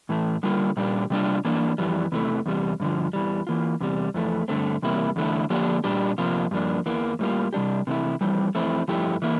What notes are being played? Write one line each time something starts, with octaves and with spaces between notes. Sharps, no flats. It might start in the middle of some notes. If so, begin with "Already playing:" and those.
A2 E3 A3
D3 G3 A#3 F4
A#2 G3 D4 G4
C3 G3 D4 F4
E3 A#3 D4
F2 E3 G3
E2 C3 E3 A3
E2 C3 G3
G2 D3 F3
E2 E3 G3
E3 A#3 F4
E2 C3 G3
F2 E3 A3
G2 D3 A3 C4
E2 C3 G3 A#3 E4
E2 D3 A3 E4
D3 F3 A#3 D4 G4
A#2 G3 D4 G4
F2 C3 F3 A#3 F4
G2 F3 A#3 D4
E2 E3 A#3
A2 G3 A#3 F4
C3 G3 D4 G4
C3 E3 A3 E4
F2 E3 G3 C4
F2 E3 A3 C4 E4
G2 F3 A3 E4 G4
E3 A#3 E4